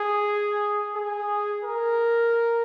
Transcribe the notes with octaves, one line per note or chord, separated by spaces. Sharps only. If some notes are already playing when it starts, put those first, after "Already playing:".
Already playing: G#4
G#4
A#4